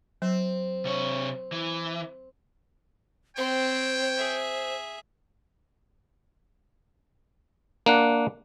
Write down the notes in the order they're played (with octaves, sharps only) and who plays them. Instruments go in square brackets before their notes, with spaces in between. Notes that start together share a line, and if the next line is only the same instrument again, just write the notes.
[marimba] F#3 [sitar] C4
[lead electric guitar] C3 C#5
E3
[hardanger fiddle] C4 [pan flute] C5 [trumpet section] C#5 G5
[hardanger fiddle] G#4 E5
[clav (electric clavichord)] A#3 D4 F#5